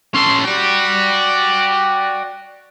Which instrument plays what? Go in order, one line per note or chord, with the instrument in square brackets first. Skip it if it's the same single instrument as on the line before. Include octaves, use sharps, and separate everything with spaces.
[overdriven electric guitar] C#4 A4 [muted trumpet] C6
[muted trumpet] F#4 [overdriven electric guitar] D5 G5